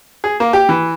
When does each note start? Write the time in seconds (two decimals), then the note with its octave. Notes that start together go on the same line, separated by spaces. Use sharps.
0.24 G#4
0.40 A#3
0.53 G4
0.69 E3